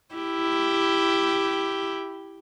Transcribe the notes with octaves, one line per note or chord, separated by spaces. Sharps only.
E4 G4